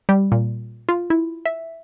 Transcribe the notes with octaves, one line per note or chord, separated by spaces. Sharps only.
G3
A#2
F4
E4
E5